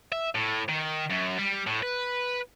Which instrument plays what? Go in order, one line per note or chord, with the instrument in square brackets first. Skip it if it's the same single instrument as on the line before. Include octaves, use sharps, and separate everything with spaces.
[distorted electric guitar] E5
A2
D#3
F#2
G3
A2
B4